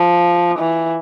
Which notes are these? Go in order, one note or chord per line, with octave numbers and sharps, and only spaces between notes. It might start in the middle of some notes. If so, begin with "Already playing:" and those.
Already playing: F3
E3